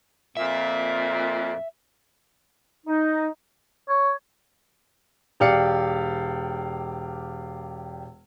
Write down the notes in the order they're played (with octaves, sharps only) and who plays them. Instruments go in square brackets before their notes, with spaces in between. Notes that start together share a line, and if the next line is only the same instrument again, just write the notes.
[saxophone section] F2 A#2 [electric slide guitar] E5
[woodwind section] D#4
[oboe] C#5
[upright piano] E1 G4 D5 F5 C#7